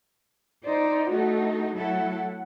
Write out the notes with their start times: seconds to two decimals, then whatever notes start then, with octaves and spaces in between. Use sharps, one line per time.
0.65 D#4 C5 D5
1.10 A3 D#4 F#4 A4
1.77 F#3 A3 E4 A4 F#5